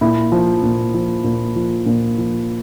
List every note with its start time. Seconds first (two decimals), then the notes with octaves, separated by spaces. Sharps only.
0.01 A#2 E4
0.32 F3
0.63 A#2
0.94 F3
1.24 A#2
1.55 F3
1.86 A#2
2.18 F3